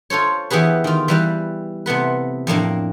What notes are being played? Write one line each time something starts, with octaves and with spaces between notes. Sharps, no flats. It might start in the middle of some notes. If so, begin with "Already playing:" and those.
F4 A4 C5 C#5
E3 B3 G4 G#4 B4
D#3 F4
E3 G3 B4
C3 A3 B3 B4
F2 A2 A#3 D4